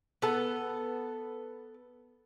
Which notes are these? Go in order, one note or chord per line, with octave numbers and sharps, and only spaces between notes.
B3 A4